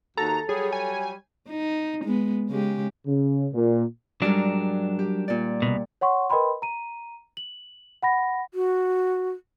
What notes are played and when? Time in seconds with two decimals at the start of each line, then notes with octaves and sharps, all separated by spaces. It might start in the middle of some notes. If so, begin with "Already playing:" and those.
0.17 D#2 F#4 A4 A#5 A6
0.49 F#3 G3 G#4 C#5
0.72 G#5
1.49 D#4
2.04 G#3 B3
2.49 C#3 G#3 G4
3.07 C#3
3.54 A#2
4.22 G#2 F#3 G3 D4 A#4
4.99 G4
5.28 A#2 D5
5.62 C2 B2
6.01 C#5 F#5 C6 C#6
6.30 A#4 B4 D#5 G5 B5 C6
6.62 A#5 D#7
7.37 F#7
8.03 F#5 B5 A#6
8.54 F#4